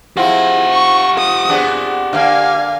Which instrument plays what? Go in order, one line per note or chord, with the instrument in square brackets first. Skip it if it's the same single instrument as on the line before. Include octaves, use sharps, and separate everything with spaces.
[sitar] F3 C4 F4 [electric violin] E4 G#4 [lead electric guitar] G4 F#5
[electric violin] C#6
D#6
[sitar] B3 C4 D4 [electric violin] G#4
[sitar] D3 A#3 [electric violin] F5 G#5